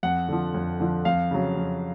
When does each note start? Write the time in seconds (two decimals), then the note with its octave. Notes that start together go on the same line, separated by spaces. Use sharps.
0.03 F2 F#5
0.28 D3 F3
0.54 F2
0.80 D3 F3
1.05 F2 F5
1.31 C#3 F#3
1.56 F2